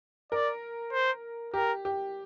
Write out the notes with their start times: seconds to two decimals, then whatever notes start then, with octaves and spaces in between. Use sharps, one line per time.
0.32 A#4 D5
0.93 C5
1.54 G4 A#4
1.85 G4